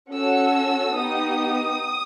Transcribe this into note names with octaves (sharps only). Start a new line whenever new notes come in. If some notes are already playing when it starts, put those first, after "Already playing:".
C#4 F#4 A4 E6
B3 D#4 G4 D#6